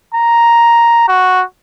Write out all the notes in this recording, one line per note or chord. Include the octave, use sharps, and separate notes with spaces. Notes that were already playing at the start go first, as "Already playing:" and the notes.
A#5
F#4